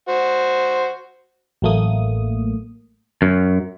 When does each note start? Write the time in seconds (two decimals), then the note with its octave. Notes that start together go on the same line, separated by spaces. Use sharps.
0.08 F#4 C5
1.62 A1 F#3 A3 A#3 D#6
3.22 F#2